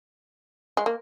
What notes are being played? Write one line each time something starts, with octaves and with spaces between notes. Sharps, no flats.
G#3
A#3